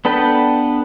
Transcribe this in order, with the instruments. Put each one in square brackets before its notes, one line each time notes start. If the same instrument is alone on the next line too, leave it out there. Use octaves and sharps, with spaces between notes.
[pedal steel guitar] B3 D4 A4 B4 G5